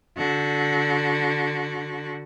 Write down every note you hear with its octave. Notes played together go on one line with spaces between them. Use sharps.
D3 F#4